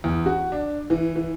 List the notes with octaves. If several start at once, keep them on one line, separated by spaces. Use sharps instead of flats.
E2
F#4
D4
E3
E3